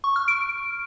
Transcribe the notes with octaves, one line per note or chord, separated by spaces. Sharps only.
C#6
F6
D7